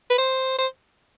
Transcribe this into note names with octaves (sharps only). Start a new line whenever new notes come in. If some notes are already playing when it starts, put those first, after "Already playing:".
B4
C5
C5